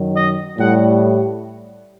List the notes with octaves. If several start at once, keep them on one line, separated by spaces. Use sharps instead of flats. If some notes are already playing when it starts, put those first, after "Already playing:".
Already playing: F#2 D#3 F#3
D#5
A2 G3 F#5